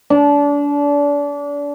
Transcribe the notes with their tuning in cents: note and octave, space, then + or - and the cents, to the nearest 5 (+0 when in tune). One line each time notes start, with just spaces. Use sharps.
D4 -30